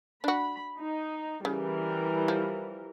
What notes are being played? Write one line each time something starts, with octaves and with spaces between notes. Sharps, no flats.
D4 F#4 B5
D#4
C#3 E3 G3 A#4
F3